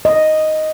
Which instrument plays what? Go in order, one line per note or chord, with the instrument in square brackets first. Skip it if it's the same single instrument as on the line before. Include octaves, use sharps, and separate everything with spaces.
[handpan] D#5